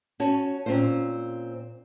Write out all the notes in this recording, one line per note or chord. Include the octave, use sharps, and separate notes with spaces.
C#4 F#4 C#5 A5
A#2 C4 C#4 F4 C5